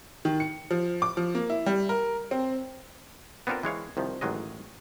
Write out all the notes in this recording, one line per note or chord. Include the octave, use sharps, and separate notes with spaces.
D#3
C#7
F3
D6
F3
A#3
E4
G3
A#4
C4
B3 C4 D4 F4 A4 A#4
E3 G#3 C#5 F5
C2 D#3 F3
A1 D#3 F#3 G#3 D#5